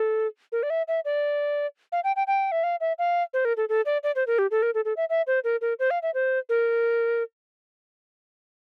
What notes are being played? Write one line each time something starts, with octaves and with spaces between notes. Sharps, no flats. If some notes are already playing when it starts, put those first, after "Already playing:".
Already playing: A4
A#4
D5
E5
E5
D5
F5
G5
G5
G5
E5
F5
E5
F5
C5
A#4
A4
A4
D5
D5
C5
A#4
G4
A4
A#4
A4
A4
E5
E5
C5
A#4
A#4
C5
F5
E5
C5
A#4